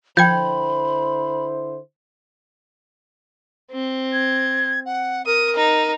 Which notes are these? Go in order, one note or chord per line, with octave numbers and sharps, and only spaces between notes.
D3 F3 E4 C5 G5 B5 G6 G#6
C4
G#6
F#5
A#4 D#6
D#4